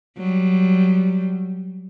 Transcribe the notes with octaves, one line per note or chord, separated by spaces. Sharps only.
F#3 G3